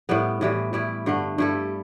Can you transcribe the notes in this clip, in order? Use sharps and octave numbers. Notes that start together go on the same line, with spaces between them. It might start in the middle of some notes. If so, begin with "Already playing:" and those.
A2 G3 B3
A2 E3 G3
A2 G3 E4
G2 D3 A3
G2 G3 E4 A4